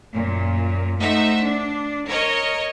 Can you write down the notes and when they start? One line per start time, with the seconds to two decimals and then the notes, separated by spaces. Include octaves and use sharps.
0.14 F#2 A#2
1.00 A3 D#4 C5 E5 F#5
1.43 D4
2.08 A#4 C#5 D#5